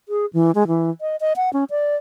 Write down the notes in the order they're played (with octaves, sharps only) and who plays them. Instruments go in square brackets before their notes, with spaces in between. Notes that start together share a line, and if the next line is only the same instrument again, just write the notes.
[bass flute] G#4
E3
G#3
E3
D#5
D#5
F#5
C#4
D5